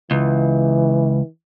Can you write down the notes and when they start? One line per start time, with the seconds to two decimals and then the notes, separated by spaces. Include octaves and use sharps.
0.11 C#2 E3